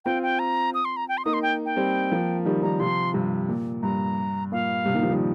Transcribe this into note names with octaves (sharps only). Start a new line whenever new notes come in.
C4 F4 G5
G5
A#5
D#6
C6
A#5
G5
C6
A#3 D#4 D#6
C6
G5
G5
G3 C4
F3 A#3
D#3 G3
D#3 G3 A#5
C3 F3 C6
G2 C3
A#2
G2 A#5
A#2 F5
G2 C3
A#2 D#3
C3 F3
D#3 G3